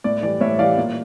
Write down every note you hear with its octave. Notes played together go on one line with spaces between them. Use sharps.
A2 D5
E3 G3 D5
A2 C#5 E5
E3 G3 D5 F5
A#2